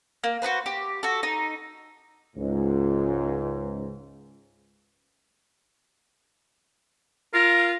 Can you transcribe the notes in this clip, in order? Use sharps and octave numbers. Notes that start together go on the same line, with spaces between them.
A#3
F#4 G#4 B4 C5
G4
F#4 A4
D#4
C#2 G#2
F4 A#4